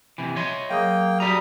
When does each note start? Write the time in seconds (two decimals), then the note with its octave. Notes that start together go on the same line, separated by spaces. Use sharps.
0.18 C3 E3
0.36 C#5 D#5 E5 C6
0.70 F#3 A#3 G#4 G5 D#6
1.20 G3 F#4 A4 E5 A#5 D#6